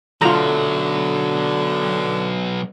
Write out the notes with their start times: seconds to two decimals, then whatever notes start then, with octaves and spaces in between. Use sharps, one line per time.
0.22 B2 D3 F#3 A3 F4 A#5